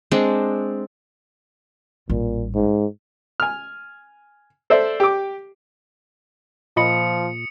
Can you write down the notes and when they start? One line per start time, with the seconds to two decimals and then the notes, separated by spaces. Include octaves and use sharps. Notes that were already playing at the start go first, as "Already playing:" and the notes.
0.11 G#3 C4 D4
2.09 A1 A#2 G3
2.55 G#2
3.40 G#5 F6
4.70 A4 C5 D5 E5
5.00 G4 D6
6.77 A#2 F3 F4 D#5 B5 D#6 C#7